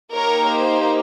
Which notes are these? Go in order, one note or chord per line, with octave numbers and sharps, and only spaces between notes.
A#3 D#4 G4 A#4 C#5
C5